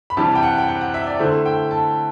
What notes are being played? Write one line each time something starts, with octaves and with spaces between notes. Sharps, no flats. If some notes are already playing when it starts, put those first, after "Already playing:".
B5
C3 E3 G3 A5
G5
F#5
G5
F#5
F#5
E5
D5
D3 A3 E4 C5
G5
A5